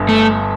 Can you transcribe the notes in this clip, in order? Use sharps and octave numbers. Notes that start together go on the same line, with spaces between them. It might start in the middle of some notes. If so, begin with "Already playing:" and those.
Already playing: G1 G2
A3